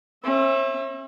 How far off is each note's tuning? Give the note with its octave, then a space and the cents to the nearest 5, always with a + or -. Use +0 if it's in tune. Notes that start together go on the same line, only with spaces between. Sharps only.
C#4 -45 E5 +0